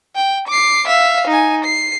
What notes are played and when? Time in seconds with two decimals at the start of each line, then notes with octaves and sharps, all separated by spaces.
0.16 G5
0.48 D6 C7
0.88 E5 F5
1.28 D#4 G#5
1.64 C7